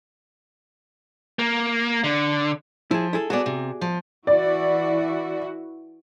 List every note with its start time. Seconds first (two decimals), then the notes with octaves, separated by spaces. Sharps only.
1.39 A#3
2.04 D3
2.91 F3 E4 G#4
3.13 E4 G#4 A4
3.30 B3 F#4 G#4 A4 D5
3.46 C3
3.81 F3
4.27 E3 E4 F#4 D5